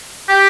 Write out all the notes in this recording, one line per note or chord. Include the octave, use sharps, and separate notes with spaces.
G4